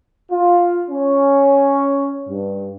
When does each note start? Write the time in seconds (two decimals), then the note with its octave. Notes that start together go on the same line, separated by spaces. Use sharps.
0.31 F4
0.90 C#4
2.28 G2